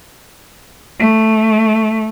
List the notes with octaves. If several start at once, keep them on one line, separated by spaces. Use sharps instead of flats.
A3